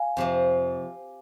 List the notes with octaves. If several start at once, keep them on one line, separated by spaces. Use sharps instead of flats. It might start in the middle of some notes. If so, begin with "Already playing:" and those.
Already playing: F5 G#5
F2 C3 F3